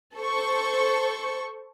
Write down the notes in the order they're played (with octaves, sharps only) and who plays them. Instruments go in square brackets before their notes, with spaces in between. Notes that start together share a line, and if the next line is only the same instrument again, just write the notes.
[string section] A4 C5 C#6